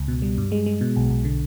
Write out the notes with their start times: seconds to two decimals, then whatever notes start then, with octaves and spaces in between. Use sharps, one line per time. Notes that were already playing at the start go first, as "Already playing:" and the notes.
Already playing: C#2
0.08 B2
0.22 G3
0.38 G2
0.52 G#3
0.66 G#3
0.81 B2
0.96 B1
1.10 B1
1.25 D3